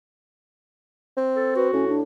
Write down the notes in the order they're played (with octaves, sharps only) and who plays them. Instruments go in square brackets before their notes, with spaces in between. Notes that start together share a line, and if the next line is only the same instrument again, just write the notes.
[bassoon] C4
[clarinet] A4
[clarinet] F#4 [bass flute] B4
[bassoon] A2 [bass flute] C#4
[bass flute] D4